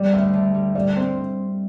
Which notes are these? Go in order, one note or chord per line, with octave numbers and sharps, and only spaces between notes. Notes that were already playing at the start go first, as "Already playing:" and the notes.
Already playing: G3 D5
D2 E5
D3
G3
G3 D5
C4 C5